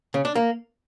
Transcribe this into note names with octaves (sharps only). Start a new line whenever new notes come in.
C#3
D4
A#3